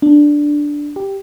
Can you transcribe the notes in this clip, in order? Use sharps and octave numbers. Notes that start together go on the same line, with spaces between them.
D4
G4